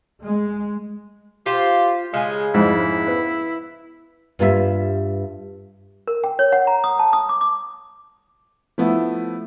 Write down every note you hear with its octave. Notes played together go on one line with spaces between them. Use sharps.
G#3
F4 G4 C5
C#3 G#3 G#5
F2 G#2 E4
B3
G2 G3 F4 A4 E5
A#4
G5
C#5
F#5
A#5
D#6
A5
D#6
D6
D6
F3 A3 B3 E4